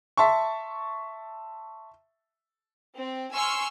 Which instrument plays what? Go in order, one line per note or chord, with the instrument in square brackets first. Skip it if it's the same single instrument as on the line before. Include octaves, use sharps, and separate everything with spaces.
[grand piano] E5 A5 C6 C#6
[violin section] C4
G#5 C6 C#6 E6 F6